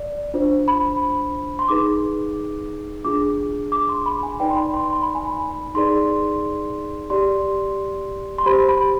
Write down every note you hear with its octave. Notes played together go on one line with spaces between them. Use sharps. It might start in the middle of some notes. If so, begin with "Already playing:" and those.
Already playing: D5
D4 F4 C5
B5
C6
D#4 G#4 B4 D6
D4 F4 G#4 D6
D6
C6
B5
G#5
D#4 B4 D5 G5
C6
B5
C6
C6
B5
G#5
B5
D#4 G#4 B4 D5 C6
G4 D5 C6
C6
G4 C5 B5
B5